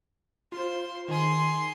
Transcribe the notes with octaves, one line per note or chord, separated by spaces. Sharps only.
F4 C5 C6
D#3 G#4 C6